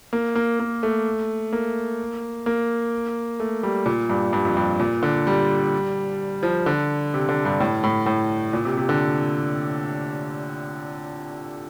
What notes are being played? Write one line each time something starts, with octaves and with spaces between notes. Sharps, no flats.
A#3
A#3
A#3
A3
A#3
A#3
A3
G3
A#2
G2
G2
F2
G2
A#2
D3
G3
F3
D3
C3
D3
G2
A2
A2
A2
A#2
C3
C3
D3